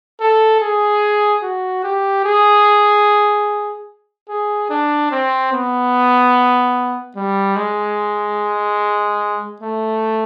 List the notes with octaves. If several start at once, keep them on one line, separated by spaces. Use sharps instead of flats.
A4
G#4
F#4
G4
G#4
G#4
D4
C4
B3
G3
G#3
A3